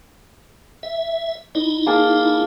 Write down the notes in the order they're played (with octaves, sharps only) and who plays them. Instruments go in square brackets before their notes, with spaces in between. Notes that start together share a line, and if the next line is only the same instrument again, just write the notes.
[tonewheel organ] E5
[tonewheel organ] D#4 E4 [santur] D#5
[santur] A#3 G#4 A5